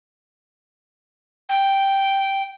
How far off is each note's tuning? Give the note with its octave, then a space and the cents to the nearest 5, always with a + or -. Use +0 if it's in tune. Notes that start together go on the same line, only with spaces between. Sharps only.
G5 -5